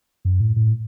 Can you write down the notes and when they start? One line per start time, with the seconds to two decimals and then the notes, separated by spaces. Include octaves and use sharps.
0.25 F#2
0.40 A2
0.56 A2